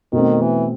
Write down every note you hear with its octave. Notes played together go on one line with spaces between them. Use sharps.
B2 D#3 A3 C4
E3